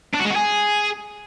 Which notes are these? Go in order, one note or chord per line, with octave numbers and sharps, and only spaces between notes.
D4
F#4
G#3
F#4
G#4